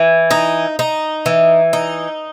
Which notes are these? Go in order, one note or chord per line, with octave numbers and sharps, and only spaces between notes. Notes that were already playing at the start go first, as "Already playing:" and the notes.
Already playing: E3
D#4
D#4
E3
D#4